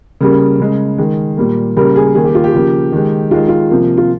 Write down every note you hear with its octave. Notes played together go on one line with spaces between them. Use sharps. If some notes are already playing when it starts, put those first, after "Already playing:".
C#3 G3 A#3 A#4
C#3 G#3
D#3 G#3
A#2 G3 A#3
C#3 G3 A#3 A#4
G#4
D#3 A#3 G#4
G4
F4
G4
C#3 F3 A#3
D#3 G#3
D#3 G#3 F4
F4
C3 F3 A#3
F4